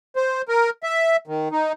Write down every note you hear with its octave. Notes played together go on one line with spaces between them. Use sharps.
C5
A#4
E5
D#3
D#4